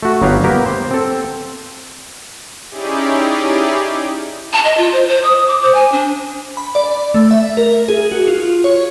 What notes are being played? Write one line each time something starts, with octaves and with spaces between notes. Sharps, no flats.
A3 F#4
G1 F#3 B3 G4 F5
A#3 B3 G4 A#4
C5
C4 A4
C#4 D#4 E4 G4 G#4 D5
A5
D#5
F4
C5
C5
D#6
D6
C5
G#5
D4
B5
D5
A3
E5
A#4
G#4
F#4
F4
C#5